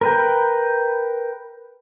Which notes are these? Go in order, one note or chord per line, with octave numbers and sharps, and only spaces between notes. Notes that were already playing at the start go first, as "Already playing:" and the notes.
A#4 B4 G5